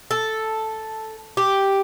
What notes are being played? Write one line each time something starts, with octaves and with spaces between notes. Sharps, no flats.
A4
G4